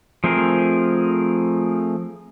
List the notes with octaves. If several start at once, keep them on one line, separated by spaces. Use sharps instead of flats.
F3 A3 C4 G#4 A#4